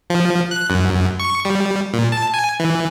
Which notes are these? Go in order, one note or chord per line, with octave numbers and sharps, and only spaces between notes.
F3
F#6
F#2
C#6
G3
A#2
A5
G#5
E3